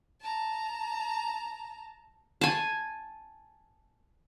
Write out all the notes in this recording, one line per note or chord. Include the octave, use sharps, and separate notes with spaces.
A5 A#5
G#5 A5